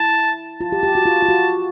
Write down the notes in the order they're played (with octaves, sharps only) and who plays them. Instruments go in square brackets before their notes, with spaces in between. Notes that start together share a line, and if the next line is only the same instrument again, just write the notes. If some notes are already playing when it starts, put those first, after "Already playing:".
Already playing: [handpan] E4 [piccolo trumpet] A5
[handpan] F4 [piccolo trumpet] A5
[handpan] G4
G4
F#4
F4
F4
F#4